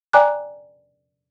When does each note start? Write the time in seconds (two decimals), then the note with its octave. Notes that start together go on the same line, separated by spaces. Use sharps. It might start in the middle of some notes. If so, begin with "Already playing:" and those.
0.13 D5 G5 G#5 A#5 D6 F#6